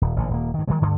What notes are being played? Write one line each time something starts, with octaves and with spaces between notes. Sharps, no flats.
D#1
A1 A#2 D3
D#1 A#3
G2 D#3
D#3 E3 F#3 G#3
D2 G2 D3 A3